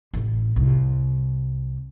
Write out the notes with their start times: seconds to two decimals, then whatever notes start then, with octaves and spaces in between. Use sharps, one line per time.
0.14 A1 A2
0.56 C2